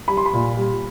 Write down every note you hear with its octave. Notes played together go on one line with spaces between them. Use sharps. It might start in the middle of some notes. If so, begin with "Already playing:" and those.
G3 B5
C6
B5
A#2
G3